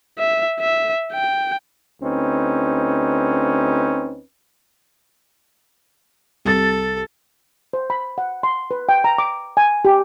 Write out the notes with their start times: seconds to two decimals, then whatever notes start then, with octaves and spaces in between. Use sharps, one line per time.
0.19 E5
0.60 E5
1.13 G5
2.01 D2 C4 C#4 D#4 B4
6.45 C2 A4 A6
7.73 C5
7.90 B5
8.18 F#5
8.43 C6
8.71 B4
8.89 G5
9.04 A#5
9.18 D6
9.57 G#5
9.85 G4